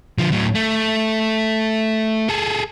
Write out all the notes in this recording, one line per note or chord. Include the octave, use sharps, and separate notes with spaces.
D3 F3
A2 F#3
A3
G#4 A4